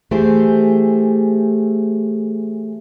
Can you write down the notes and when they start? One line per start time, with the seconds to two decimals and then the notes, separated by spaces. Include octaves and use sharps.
0.11 E3 A3 G4 G#4 C5